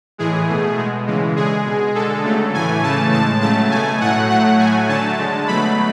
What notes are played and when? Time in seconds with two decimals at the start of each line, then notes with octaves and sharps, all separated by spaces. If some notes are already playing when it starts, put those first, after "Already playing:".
0.18 A2 E3 G#3 G#4
0.48 B2 A3
0.77 B2 G#3
1.07 C#3 E3 G#3
1.36 D3 G#3 G#4
1.65 B2
1.70 G#3
1.95 D3 G#3 A4
2.24 C#3 F#3 A3
2.54 A2 E3 A3 G#5
2.83 C#3 E3 A3 A5
3.13 A2 G#3 A5
3.42 C#3 F#3 A3 A5
3.71 B2 A3 G#5
4.01 A2 F#3 A3 F#5
4.30 A2 F#3 A3 F#5
4.60 A2 F#3 A3 G#5
4.88 D3 F#3 A3 A5
5.18 D3 G#3
5.48 B2 F#3 A3 B5